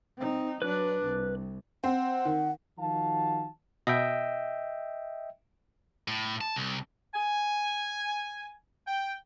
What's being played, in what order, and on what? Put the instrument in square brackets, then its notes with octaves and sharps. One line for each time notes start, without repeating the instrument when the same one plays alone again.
[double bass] C4 D#4
[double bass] F#3 D4 [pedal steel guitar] B4 F#6
[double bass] C2
[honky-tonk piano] C4 [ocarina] F#5
[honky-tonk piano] D#3
[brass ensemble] D#3 F3 F#4 F5 A5
[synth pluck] B2 [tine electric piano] D#5 E5 G5
[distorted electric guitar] A2
A5
C2
[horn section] G#5
G5